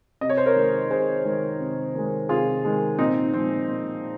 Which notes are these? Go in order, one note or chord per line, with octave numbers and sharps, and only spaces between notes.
C3 D#5
C#5
C5
A#4 C#5
D#3 G#3
C3 G#4 C5
D#3 G#3
C3
D#3 G#3
C3 F4 G#4
D#3 G#3
A#2 C4 D#4
F3 G#3 C4
A#2